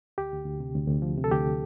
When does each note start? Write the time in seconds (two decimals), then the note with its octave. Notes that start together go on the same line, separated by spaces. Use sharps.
0.18 D2 G4
0.32 D2
0.45 D2
0.60 C3
0.75 D2
0.88 D2
1.02 F3
1.17 C3
1.24 A4
1.31 D2 G4